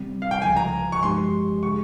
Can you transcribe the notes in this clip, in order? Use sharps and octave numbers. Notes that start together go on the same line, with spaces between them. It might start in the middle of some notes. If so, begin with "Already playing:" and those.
Already playing: C3 G3 C4
F5
G5
C#2 C#3 F3 G#5
A#5
C#6
G2 F3 G#3 D#4 G4 C6
C#3 G#3 D#4 G#4 C#6